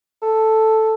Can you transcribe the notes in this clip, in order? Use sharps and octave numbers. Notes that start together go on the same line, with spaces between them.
A4